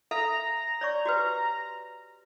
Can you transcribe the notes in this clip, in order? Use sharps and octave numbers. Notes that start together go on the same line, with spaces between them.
A4 E5 F5 A#5
C#5 D5 C#6
F#4 G4 B4